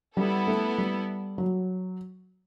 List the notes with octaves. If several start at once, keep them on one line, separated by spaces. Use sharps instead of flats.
G3 B3 E4 A4
A3
G3
F#3